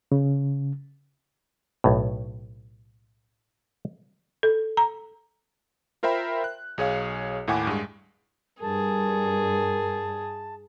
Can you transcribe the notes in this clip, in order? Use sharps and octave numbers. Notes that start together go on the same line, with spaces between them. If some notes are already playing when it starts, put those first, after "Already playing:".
C#3
B1 A2
A4
A#5
F4 A#4 C5 E5 G5 B5
F#6
B1 G#4 C#5 F5
D#2 A2 E4 F#5 G#5 D6
G2 G#3
G2 G#4 A#4 A5